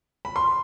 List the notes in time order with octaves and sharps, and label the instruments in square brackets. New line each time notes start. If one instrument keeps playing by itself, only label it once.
[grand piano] B5
C6